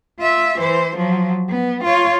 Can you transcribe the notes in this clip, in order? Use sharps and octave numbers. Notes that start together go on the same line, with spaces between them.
F4 E5
E3 C5
F3 F#3
B3
F4 C#5